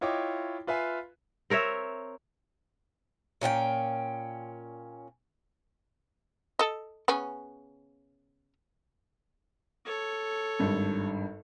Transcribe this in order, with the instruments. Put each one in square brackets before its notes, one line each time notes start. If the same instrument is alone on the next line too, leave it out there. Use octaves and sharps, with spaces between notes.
[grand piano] E4 F4 C#5 D#5 G5 D6
F4 B4 E5 F5 G#5
[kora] C4 A#4 C#5 E5
[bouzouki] A#2 C#4 F4 G5
[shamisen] A4 D#5
C#3 B3 C#4
[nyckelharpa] A4 C#5
[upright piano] G#1 G2